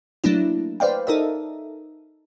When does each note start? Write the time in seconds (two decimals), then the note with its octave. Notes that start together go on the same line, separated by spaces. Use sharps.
0.24 F#3 A3 A#3 D4 E4
0.80 B4 C5 D5 F5 G5
1.07 D#4 A4 A#4 D#5 E5